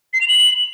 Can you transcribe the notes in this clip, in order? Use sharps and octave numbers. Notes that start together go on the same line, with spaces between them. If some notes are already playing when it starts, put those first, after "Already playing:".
C7
F7
F#7